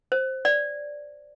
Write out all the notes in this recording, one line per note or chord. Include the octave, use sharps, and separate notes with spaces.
C5
D5